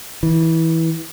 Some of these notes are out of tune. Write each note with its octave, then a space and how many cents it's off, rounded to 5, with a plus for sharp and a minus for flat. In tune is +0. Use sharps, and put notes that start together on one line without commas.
E3 -20